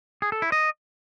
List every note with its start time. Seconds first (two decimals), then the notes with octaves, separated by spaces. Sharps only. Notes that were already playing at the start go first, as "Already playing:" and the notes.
0.22 G#4
0.32 A4
0.42 E4
0.52 D#5